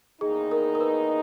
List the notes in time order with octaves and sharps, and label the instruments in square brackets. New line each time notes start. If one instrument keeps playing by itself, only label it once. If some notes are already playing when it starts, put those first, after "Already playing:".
[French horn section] E2 D#3 A#3 D#4 [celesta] G#4
[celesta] A#4
A#4
B4